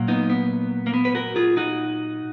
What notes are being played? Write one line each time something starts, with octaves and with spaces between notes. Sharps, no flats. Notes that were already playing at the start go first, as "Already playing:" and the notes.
Already playing: A#2 F#3 A#3
B3 D#4
B3
A#3
B3
B4
F#4 A#4
F4 G#4
D#4 F#4